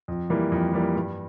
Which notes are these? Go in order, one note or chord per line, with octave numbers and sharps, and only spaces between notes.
F2
E3 G3 A#3
F2
E3 G3 A#3
G2